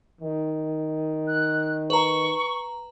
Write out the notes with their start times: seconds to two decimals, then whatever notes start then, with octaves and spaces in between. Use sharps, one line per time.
0.21 D#3
1.28 F#6
1.90 B4 A#5 C#6